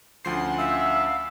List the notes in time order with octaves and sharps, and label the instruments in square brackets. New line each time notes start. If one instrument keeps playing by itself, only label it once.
[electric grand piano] D2 F3 C7 [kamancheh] C#4 F#5 [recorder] C6
[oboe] E5 [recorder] F5